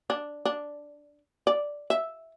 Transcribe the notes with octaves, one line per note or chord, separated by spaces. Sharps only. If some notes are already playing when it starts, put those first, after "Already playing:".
D4
D4
D5
E5